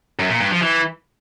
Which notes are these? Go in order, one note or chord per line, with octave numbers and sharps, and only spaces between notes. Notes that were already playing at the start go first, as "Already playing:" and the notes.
F#2
A#2
G2
F3
E3